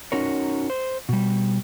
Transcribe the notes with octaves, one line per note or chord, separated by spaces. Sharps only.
C#4 D#4 F#4 A#4 C#5
C5
B2 G3